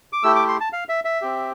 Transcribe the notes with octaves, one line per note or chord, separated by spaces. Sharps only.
D6
A3 E4 G4 E6
D6
C6
A5
F5
E5
E5
C4 G4